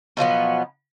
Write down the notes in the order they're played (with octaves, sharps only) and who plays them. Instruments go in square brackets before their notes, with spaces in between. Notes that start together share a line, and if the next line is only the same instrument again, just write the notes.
[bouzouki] B2 F3 F#3 B3